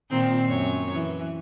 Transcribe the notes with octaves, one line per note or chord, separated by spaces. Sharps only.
A#2 D#3 C4
F#2 C#5
E3